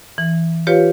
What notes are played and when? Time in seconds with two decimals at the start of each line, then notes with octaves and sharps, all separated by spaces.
0.18 E3
0.67 F4 G4 B4 C#5 F5